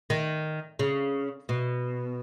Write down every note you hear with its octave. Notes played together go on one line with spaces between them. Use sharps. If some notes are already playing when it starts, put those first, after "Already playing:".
D#3
C#3
B2